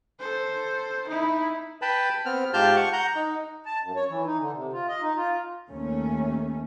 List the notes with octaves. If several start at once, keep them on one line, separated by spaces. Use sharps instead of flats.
A4 C5
D#4 E4
B4 G5 A5 B5
B3 C4 F6
G#2 F4 G4 A5 F6 G6
F#5 C#6
F#5 A#5 G6
D#4
A5
F#2
C#5
E3
D#4
D3
C3
F4
D#5
D#4
F4
D#2 A3 C#4